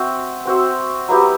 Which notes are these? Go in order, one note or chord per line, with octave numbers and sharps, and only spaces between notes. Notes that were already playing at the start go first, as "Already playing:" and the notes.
Already playing: C4 F#4 C5 E5
C4 F#4 C5 E5
F#3 B3 E4 G4